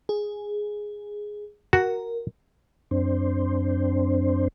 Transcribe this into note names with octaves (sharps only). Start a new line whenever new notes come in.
G#4
F#4 A#4
F#2 C4 D4 C5